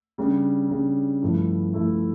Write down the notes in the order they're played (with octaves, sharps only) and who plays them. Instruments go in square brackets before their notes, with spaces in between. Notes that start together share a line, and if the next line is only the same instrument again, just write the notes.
[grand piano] C#3 G3 D4
C#3 G3 D4
G2 F3 A3 E4
G2 F3 A3 E4